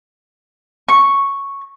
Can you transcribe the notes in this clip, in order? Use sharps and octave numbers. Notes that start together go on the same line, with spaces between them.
C#6